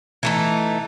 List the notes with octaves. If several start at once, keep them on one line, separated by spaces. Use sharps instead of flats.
E3 A3 D#4